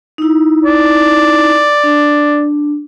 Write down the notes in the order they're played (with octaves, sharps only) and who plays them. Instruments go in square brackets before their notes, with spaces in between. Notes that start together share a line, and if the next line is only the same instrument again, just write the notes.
[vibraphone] D#4 E4
[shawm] D5
[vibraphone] D4